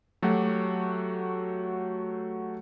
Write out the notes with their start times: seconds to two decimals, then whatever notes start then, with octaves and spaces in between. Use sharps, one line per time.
0.22 F#3 A3 F#4 G4 F#5